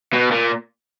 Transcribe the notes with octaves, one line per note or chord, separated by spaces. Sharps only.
B2
A#2